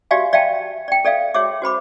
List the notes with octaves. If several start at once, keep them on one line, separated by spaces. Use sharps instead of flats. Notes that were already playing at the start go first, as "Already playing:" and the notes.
F#4 G4 D5 E5 F5 G#5
D5 E5 F5 G5 A5
D5 G5
A4 D5 E5 F5
F#4 G#4 C#5 E5 D6
F#4 C5 B5 D6